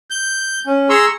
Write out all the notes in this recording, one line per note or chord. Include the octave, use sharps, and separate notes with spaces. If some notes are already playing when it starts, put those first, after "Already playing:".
G6
C#4
G#4 A#5 C6 C#6 E6